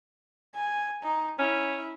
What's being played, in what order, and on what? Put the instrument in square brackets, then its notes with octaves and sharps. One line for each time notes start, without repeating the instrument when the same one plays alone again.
[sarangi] G#5
D#4
[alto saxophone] C#4 [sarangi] E4